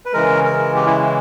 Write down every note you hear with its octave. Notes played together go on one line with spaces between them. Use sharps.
B4
C#3 E3 G#3 A#4
A#4
G4
E4